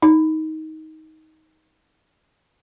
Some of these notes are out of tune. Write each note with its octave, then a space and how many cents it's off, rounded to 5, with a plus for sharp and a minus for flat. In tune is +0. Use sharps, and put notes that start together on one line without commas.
D#4 +15